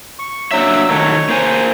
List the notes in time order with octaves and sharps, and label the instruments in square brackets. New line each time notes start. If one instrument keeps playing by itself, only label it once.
[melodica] C#6
[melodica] F#3 E6 [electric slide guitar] A#3 D4 E5
[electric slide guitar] D#3 F#3 A3 [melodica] C#5 C#6
[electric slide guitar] A#3 C5 G#5